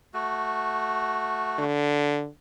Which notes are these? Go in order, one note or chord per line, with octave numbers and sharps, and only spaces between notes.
A3 F#4
D3